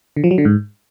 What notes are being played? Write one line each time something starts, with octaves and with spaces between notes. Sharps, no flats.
D3
F3
F#3
D3
G#2